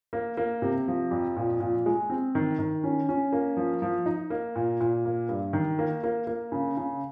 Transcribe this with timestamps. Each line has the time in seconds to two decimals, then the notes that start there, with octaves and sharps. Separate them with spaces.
0.13 A#3
0.37 A#3
0.62 C3
0.88 F3
1.11 F2
1.37 A#2
1.60 A#2
1.86 G#3
2.10 C4
2.35 D#3
2.59 D#3
2.84 C#4
3.09 C#4
3.32 A#3
3.57 F3
3.82 F3
4.06 D#4
4.30 A#3
4.56 A#2
4.80 A#2
5.05 A#3
5.29 G2
5.53 D#3
5.79 A#3
6.04 A#3
6.27 A#3
6.52 C#3
6.77 C#3